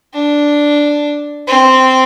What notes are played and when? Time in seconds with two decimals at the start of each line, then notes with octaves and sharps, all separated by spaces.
0.14 D4
1.48 C4